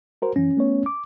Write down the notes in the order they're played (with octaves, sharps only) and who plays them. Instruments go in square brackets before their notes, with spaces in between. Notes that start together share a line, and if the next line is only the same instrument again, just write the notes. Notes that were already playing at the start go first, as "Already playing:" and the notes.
[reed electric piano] F#4 A#4 C5
[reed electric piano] F#2 E3 [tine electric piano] C#4
[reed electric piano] A3 B3 C#5
D6